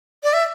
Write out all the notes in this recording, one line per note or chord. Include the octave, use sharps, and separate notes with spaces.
D5
E5